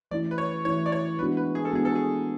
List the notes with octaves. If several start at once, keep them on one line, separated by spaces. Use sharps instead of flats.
E3 A3 C#4 E4 D5
B4
C#5
E3 A3 C#4 E4 C#5
D5
C#5
G#3 B3 D4 F#4 B4
B4
G#4
A4
G#3 B3 D4 F#4 G#4
A4
G#4